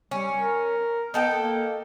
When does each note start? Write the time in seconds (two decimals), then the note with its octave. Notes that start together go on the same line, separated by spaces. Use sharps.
0.11 G3 C#4
0.37 A#4
1.14 B3 D#4 A4 G5
1.34 A#3